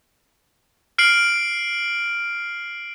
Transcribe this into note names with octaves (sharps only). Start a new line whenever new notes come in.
F6 C7 D7 F#7